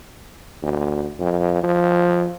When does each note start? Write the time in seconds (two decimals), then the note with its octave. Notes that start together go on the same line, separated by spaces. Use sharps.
0.62 D2
1.20 F2
1.64 F3